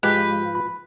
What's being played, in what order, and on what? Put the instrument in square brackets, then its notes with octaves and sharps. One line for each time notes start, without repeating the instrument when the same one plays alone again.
[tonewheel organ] G#2 F3 F4 [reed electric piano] G#3 G4 G6 [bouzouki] B4
[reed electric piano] B5